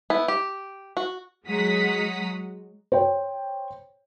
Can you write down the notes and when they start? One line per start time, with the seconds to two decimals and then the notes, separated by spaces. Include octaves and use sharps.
0.10 B3 E4
0.28 G4
0.97 F#4
1.48 F#3 G#3 F#5 A#5 D#6 B6
2.92 C5 C#5 G5